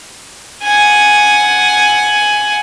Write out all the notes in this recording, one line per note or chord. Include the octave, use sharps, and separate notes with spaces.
F#5 G#5